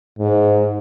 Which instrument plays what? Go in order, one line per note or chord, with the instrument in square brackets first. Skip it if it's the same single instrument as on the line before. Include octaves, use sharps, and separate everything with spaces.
[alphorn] G#2